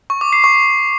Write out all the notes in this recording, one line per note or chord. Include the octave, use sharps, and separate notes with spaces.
C#6
D6
C7
C#6